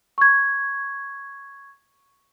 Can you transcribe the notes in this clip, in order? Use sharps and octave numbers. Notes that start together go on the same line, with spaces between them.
C#6 G#6